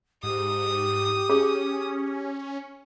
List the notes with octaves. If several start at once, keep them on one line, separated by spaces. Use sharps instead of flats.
G#2 G4 D#6
C#4 G#4